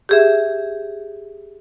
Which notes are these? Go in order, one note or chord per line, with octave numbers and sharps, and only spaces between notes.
G4 G#4 E5